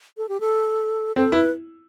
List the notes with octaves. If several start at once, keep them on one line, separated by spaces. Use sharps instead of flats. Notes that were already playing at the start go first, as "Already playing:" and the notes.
A4
G4
A4
C4 A4
E4 B4